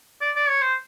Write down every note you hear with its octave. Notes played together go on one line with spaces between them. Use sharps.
D5
D5
C#5
C5